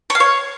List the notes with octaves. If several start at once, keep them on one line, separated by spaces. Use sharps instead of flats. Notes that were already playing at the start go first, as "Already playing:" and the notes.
C#5
F5
C#5